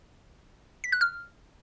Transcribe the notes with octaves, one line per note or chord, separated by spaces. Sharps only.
B6
F#6
F6